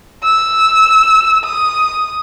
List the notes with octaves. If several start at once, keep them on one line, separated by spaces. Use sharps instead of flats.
E6
D#6